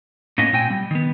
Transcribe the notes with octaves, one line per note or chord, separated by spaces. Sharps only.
A2 A#3 B3 C#4 D#5
A#2 C4 G5 G#5
G3
D#3 B3